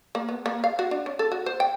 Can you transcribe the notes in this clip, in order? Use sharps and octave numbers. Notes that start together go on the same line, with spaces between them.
A#3
B3
A#3
F5
F#4
D4
C#4
A4
F#4
C5
G5